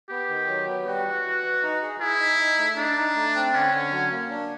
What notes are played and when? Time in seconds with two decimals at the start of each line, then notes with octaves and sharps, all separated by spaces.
0.09 B3 G4
0.29 D#3
0.47 F#3
0.67 B3
0.86 G3 F#4
1.05 E3
1.24 E3
1.44 E3
1.63 D#4
1.82 G#4
2.00 E4 G#4
2.20 D#4
2.39 D#4
2.58 A3
2.77 D4 D#4
2.97 D#4
3.15 A3
3.35 C4
3.54 D3 C#4
3.73 D3
3.92 F#3
4.11 A#3
4.30 D4